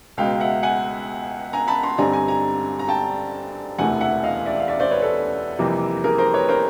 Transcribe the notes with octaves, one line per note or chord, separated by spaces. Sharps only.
C#2 B2 G#3 F5 G5
E5 F#5
F#5 G#5
G#5 A#5
A5 B5
A#5 C6
G2 D3 G3 C4 D#4 G#5 A#5
G#5 A#5
G#5 A#5
A#5
G5 A5
E1 D2 C3 E3 A3 F#5 G#5
E5 F#5
D#5 F5
D5 E5
F5
D5 E5
C5 D5
B4 C#5
A4 B4
F2 C3 E3 G3 A#3
G#4 A#4
A#4 C5
B4 C#5
A#4 C5